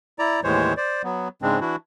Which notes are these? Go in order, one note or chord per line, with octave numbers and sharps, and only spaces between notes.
E4 D5 A#5
D#2 A2 E3 G#3 C5 C#5
C5 D5
F#3 B3
G#2 C#3 G#3 C4 D4
E3 D4 E4 F#4